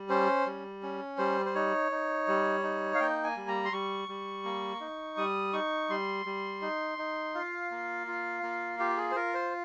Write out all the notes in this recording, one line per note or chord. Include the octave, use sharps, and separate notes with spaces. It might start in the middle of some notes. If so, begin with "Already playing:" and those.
Already playing: G3
C#4 C5
G3
C#4
G3 C5
C5
D#4 C#5
D#4
G3
D#4
F5
A#3 G5
G#5
G3
A#5
C6
G3 C#6
G3
A#3
D#4
G3 D#6
D#4 C#6
G3 C6
G3
D#4
D#4
F4 F5
A#3
F4
A#3
F4 G4
G#4
C5
F4 A#4
C5